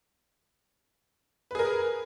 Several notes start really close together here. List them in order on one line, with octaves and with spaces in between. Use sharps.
B4 G#4 A#4